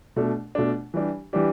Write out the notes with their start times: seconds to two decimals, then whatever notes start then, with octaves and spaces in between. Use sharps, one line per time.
0.16 B2 A3 D4
0.55 B2 A3 D4
0.94 E3 G3 D4 G4
1.33 E3 G3 D4 G4